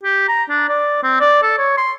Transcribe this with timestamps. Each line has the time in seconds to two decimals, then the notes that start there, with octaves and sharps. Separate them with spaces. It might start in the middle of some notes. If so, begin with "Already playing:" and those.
0.04 G4
0.28 A#5
0.50 D4
0.69 D5
1.03 C4
1.20 D5
1.43 A4
1.58 C#5
1.78 C6